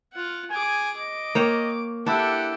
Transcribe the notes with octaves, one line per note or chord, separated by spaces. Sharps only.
F4 F#5
G#4 G#5 D6
D#5 D6
A#3 C#5 G5
D4 E4 G4 A4 F#5